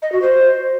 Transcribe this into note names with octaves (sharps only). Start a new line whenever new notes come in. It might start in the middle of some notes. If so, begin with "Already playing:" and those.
D#5
F#4
C5